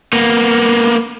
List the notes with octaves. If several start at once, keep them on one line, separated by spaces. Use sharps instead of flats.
A#3 B3